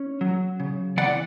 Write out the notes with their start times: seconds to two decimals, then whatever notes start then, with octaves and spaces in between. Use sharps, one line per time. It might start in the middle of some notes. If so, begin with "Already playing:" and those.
Already playing: C#4 C#5
0.21 F#3
0.60 C#3
0.97 E3 D5 F#5